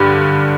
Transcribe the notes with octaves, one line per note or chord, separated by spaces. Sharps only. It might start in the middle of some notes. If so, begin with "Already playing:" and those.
Already playing: G2 D3 G3